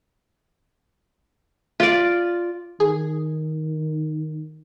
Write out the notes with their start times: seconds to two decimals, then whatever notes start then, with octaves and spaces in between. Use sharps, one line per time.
1.80 F4 D5
2.80 D#3 G#4